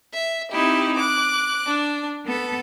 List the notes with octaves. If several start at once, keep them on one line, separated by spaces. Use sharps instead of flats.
E5
C4 D#4 E4 G4
D6 F#6
D4
B3 A4